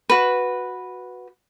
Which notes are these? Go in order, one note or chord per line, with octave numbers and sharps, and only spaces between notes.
F#4 B4